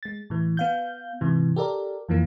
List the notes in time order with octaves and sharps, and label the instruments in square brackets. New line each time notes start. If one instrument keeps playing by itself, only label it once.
[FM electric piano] G#3 A6
A2 E3
B3 F5 G6
G#2 C3 E3
G4 A4 A#4 D5
F2 E3 F3 A#3